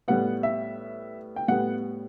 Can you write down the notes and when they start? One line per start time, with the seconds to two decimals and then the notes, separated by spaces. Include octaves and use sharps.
0.08 A2 G3 B3 F#5
0.43 E5
1.36 G5
1.48 A2 G3 B3 F#5